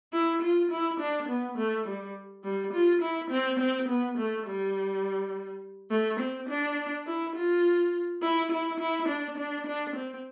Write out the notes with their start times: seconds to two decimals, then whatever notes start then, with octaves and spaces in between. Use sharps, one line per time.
0.13 E4
0.42 F4
0.71 E4
1.00 D4
1.29 B3
1.58 A3
1.86 G3
2.44 G3
2.73 F4
3.02 E4
3.30 C4
3.59 C4
3.88 B3
4.17 A3
4.46 G3
5.91 A3
6.20 C4
6.49 D4
7.07 E4
7.35 F4
8.22 E4
8.51 E4
8.80 E4
9.08 D4
9.38 D4
9.67 D4
9.96 C4